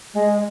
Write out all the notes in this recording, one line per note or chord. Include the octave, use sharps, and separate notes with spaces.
G#3